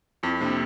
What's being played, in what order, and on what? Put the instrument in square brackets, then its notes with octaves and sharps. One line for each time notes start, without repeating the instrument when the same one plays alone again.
[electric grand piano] F2 [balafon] C4 E4
[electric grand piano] C3 [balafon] A#3 D4